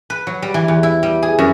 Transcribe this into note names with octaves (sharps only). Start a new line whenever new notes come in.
B4
F#3
G3
E3
E2
E4
G3
G#4
F#2